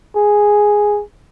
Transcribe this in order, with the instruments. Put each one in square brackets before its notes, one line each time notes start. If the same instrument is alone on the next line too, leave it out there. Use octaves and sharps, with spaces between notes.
[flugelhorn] G#4